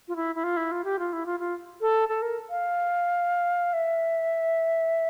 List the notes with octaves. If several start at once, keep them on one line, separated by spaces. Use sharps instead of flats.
F4
E4
E4
F4
E4
F4
G4
F4
E4
F4
F4
A4
A4
A#4
F5
E5